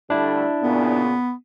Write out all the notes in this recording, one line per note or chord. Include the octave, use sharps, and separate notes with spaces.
D3 G3 A3 D4 E4
A#2 C#3 B3